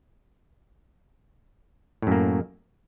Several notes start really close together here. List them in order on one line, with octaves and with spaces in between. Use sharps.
A2 F#2 A#3